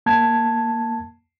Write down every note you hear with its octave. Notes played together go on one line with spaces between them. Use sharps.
A#3 A5 G#6